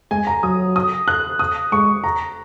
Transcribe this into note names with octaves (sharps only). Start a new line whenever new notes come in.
G#3 G#5
A#5
F#3 D#6
D#6
F#6
D#6
G#3 C#6
A#5